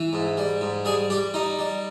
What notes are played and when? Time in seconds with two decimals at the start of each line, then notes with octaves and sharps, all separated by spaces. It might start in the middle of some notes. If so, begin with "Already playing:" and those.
Already playing: E3
0.13 G#2
0.37 G3
0.61 G#2
0.85 G3 G#4
1.10 G3 G4
1.34 G3 D#4
1.59 G3